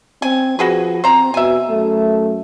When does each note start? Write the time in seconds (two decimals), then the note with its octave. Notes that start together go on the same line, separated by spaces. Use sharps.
0.22 C4 G#5
0.59 F3 F#4 G#4 B4
1.04 C4 C5 A#5
1.34 B2 E5 G#5
1.70 F#2 A3